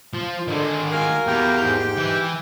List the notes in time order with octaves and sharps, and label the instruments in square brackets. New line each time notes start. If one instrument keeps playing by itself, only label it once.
[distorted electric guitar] F3
[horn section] D3 [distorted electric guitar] D#3 G#3
[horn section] F#4 A#4 F5 [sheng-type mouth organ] G#5
[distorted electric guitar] E2 [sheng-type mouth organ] G4 G5
[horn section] G#2
[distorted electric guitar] E3